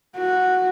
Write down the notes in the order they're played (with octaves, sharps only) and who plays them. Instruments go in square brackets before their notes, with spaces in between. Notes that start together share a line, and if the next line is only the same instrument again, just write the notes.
[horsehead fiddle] F#4